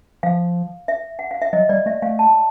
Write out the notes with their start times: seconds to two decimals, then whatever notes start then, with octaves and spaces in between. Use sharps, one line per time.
0.23 F3 F5
0.88 E5
1.19 F#5
1.31 F5
1.42 E5
1.53 F#3 D#5
1.69 G3 D5
1.86 A3 E5
2.02 A3 F5
2.19 A5